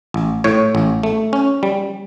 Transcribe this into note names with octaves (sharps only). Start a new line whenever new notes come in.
A1
A2 C#5
A1
A3
C#4
G3